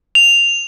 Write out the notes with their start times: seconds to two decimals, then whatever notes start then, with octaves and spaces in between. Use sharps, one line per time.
0.15 F7